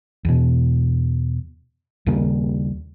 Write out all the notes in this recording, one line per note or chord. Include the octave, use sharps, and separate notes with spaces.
E2 B2
D#2 C#3 G3 A#3